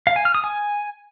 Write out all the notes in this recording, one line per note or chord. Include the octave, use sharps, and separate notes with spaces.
F5
G#5
F6
D#6
G#5